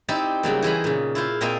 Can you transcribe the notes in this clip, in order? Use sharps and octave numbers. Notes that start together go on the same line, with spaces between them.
C4 D#4 E4 G4 D5
C#3 F#3 G3 A#3
E3 G#4 C5 D#5 A#5 B5
A#2 C#3
E4 F4 C5
A#2 A#3 C4 C5 D#5 F5